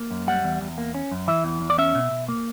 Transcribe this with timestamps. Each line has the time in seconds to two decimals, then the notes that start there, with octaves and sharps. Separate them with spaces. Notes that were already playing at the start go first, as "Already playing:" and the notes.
Already playing: A#3
0.11 F#2
0.27 G3 F#5
0.44 E2
0.61 E2
0.78 A#3
0.94 C#4
1.11 F#2
1.28 E3 E5
1.44 E2
1.61 E2
1.70 D5
1.78 C#4 E5
1.95 B2
2.11 B2
2.28 A#3